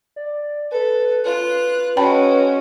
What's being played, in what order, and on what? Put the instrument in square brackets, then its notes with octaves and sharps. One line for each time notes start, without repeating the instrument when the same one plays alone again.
[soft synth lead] D5
[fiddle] A4 [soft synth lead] B4
[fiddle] F4 F#6 [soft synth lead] B4
[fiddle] G#3 F#4 [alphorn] C#4 [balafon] G5 A5 B5